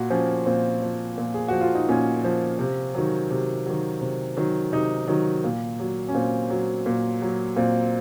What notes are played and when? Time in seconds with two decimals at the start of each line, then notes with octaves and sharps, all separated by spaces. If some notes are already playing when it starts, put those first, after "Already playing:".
Already playing: A#2 F#4
0.10 F3 C#4
0.46 A#2 C4
0.82 F3
1.18 A#2
1.34 G#4
1.48 F3 F#4
1.61 F4
1.75 D#4
1.89 A#2 C#4
2.24 F3
2.59 C3
2.95 D#3 F#3
3.31 C3
3.66 D#3 F#3
4.01 C3
4.37 D#3 F#3
4.72 C3 D#4
5.08 D#3 F#3
5.44 A#2
5.80 F#3
6.09 C#4
6.14 A#2 C4
6.50 F#3
6.86 A#2
7.22 F#3
7.56 A#2 C4